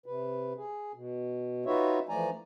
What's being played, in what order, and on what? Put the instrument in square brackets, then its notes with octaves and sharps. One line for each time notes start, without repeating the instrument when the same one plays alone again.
[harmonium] C3 B4
G#4
B2
D#4 F4 F#4 B4 C#5 E5
E3 F3 A3 D5 G#5 A#5